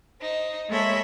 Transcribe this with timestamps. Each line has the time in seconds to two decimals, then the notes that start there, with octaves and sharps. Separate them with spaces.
0.20 D#4 C5
0.68 G#3 A#3 A4 C#5 E5 B5